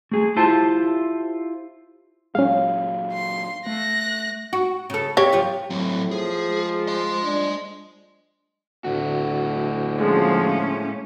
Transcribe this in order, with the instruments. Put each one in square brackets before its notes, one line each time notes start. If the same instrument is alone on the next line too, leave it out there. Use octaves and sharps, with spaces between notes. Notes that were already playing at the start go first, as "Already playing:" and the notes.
[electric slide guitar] A3 G#4
E4 F4 G4 C5 A5
[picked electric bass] A#2 F#3 [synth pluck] G#3 C#4 [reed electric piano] F5
[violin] C6
[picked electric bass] A3 [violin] F#6 A#6
[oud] F#4
C#3 A4
[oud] C3 [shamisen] G4 C#5
[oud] F#2 F3 F4
[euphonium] A2 [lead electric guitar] F#3 C4
[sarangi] F3 [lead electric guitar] G#4
[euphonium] G#3
[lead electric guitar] D#5 C6
[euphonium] D4
[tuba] D2 [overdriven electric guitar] A2 F#4
[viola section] F3 G#3 [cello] A#3 C#4